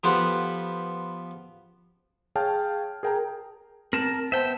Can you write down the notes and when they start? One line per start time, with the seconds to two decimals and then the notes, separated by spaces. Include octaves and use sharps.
0.03 F3 B3 G4 A4 B4 C5
2.35 G#4 C#5 F5 G5 A5 F6
3.03 G#4 A#4 G5 A5 A#5
3.93 C4 A#4 A5
4.32 B3 C5 E5 G5 A5